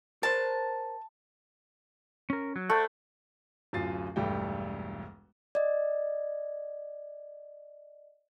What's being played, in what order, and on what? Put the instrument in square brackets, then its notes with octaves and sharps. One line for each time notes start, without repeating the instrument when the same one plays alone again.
[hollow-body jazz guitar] A#4 C5 [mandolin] A5
[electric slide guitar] C#4 A#4
F#3
[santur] A3 [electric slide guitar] C5 D5 F#5
[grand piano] D1 F#2 F4 A6 C7
E1 B1 G2 G3 A3 G5
[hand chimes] D5 D#5